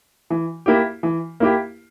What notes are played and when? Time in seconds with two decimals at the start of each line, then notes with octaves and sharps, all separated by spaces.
0.30 E3
0.66 A#3 E4 G4
1.03 E3
1.40 A#3 E4 G4